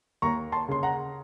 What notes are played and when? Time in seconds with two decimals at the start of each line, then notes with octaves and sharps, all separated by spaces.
0.22 D#2 A#5 C#6
0.52 A5 C6
0.68 C#3 C6
0.83 F#5 A#5